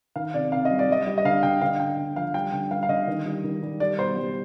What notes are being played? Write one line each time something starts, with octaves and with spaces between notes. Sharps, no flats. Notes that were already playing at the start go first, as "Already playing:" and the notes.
D#3 F5
C3 D5
C3 F5
D#5
G3
D5
G3 D#5
G3
D#5
D3 F5
D3 G5
D3 F5
D3 G5
D3
F3 F5
G3 G5
D3 G5
G3 F5
F5
D3 D#5
D#3
G3
D#3
G3
G3 D5
B2 C5
G3